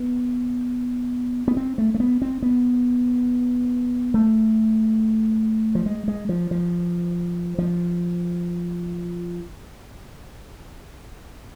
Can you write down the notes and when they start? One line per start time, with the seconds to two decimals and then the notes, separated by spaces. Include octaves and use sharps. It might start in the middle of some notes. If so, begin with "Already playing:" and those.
Already playing: B3
1.48 B3
1.57 C4
1.78 A3
1.94 A3
2.00 B3
2.22 C4
2.42 B3
4.14 A3
5.75 F3
5.86 G#3
6.08 G#3
6.29 F3
6.51 F3
7.58 F3